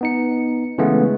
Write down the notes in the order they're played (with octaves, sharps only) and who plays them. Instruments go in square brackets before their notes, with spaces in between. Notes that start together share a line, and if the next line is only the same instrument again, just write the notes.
[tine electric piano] B3 D#4 C#7
C#3 E3 G#3 A3 B3